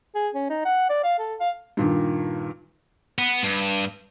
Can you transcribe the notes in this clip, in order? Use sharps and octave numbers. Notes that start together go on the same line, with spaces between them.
G#4
C#4
D#4
F#5
D5
F5
A4
F5
G2 A#2 D#3
B3
G2